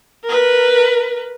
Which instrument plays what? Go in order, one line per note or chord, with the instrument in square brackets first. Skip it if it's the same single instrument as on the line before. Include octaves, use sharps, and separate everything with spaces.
[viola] A#4 B4